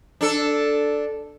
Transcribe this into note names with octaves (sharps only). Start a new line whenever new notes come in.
D4 A4